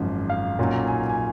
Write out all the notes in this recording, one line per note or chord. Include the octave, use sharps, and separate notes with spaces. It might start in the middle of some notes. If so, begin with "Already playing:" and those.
Already playing: G#1 F#2 C#3 F3
F5
B1 A#2 F#3 C#4
G#5
G#5